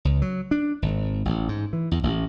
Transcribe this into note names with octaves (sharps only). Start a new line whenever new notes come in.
C#2
F#3
D4
G#1
A1
G#2
E3
E2
A1